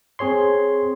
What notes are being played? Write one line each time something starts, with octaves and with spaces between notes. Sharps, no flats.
C4 G#4 C#5 C6